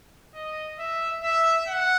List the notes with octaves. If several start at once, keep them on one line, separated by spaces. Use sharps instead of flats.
D#5
E5
E5
F#5